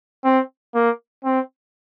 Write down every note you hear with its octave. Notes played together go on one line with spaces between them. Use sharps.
C4
A#3
C4